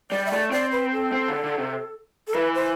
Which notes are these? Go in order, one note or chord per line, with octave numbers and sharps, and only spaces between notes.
G3 D5
E5
A3 D5
C4 D5
B4
A4
C4
D3
D3
C3
A4
E3 B4
C5